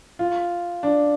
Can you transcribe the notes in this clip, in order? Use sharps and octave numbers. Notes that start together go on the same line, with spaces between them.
F4
D4